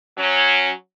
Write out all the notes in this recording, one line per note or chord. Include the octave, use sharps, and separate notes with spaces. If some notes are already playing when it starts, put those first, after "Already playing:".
F#3 C#4